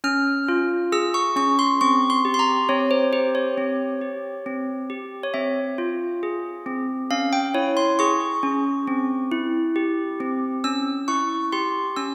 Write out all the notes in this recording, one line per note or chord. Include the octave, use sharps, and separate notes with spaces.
C#4 F6
F4
G#4 E6
C#6
C#4 C#6
C6
C4 C#6
C6
G4
C6
A#5
C4 C#5
C5
G4 C5
C#5
C4
G4
C4
G4
C#5
C4 E5
F4
G#4
C4
C#4 F5
G5
E4 C#5
C6
G#4 C#6
C#4
C4
E4
G4
C4
C#4 E6
E4 C#6
G4 C6
C#4 E6